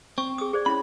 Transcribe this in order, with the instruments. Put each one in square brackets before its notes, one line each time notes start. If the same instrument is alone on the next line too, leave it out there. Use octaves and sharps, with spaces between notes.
[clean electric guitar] C4 [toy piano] C#6
[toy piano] G#4 D#6
G#4 C5 D5
[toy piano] C#4 E4 C#5 [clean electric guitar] B5